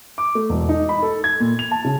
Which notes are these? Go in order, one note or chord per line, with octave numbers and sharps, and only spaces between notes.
D6
A3
E1
D#4
B5
A4
G#6
A#2
F7
A5
C#3